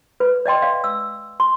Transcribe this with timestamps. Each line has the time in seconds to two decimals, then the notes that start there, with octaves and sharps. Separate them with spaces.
0.20 B4
0.46 D5 D#5 G5 C6
0.62 D5 F5
0.84 E6
1.40 C6